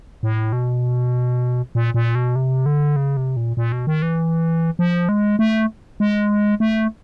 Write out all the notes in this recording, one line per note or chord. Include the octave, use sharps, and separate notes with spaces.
A2
B2
A#2
A#2
B2
C3
D3
C#3
C3
A#2
A#2
B2
D#3
E3
F3
G#3
A3
G#3
A3